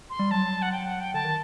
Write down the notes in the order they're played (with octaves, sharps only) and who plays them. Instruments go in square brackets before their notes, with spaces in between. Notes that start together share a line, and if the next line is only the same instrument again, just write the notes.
[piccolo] C6
[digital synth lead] G3
[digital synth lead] F#3 [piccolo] A5
[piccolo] F#5
G5
F#5
G5
[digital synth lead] D3 [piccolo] A5
[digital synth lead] D#3